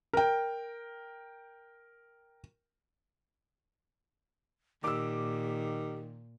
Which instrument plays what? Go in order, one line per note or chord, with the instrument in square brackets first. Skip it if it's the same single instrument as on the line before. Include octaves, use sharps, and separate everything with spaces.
[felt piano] A#4 G5
[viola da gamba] A#2 [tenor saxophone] D#3 [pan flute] G4 [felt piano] D6 E6